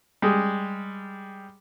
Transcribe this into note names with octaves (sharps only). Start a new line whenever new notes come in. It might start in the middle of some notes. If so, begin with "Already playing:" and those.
G3 G#3 G#4